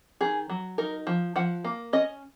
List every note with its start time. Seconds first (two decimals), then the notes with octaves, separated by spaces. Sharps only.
0.21 D#3 G#4
0.50 F#3
0.78 D#4 A#4
1.07 F3
1.36 F3 F#5
1.64 A#3
1.93 C#4 D#5